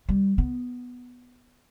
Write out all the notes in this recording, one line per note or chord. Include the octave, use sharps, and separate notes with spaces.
G3
B3